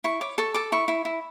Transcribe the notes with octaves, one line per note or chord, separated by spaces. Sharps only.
E4 C#6
C#5 D6
A4 C#6
A4 D6
E4 C#6
E4
E4